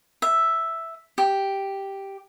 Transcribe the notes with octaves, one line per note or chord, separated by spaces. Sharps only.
E5
G4